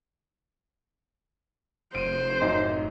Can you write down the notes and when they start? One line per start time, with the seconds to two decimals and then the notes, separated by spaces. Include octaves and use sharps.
1.95 F1 C5 D7 D#7
2.41 A1 F#2 D#4